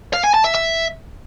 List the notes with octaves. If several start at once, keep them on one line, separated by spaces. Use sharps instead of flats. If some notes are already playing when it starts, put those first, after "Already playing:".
F5
G#5
A5
E5
E5